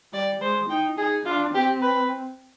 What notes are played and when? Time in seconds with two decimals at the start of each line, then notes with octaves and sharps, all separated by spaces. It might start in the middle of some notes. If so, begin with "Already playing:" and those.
0.13 G3 D5
0.41 G#3 C5
0.70 D#4 G5
0.98 D#4 G#4
1.25 D4 F4
1.54 C4 G4
1.82 B4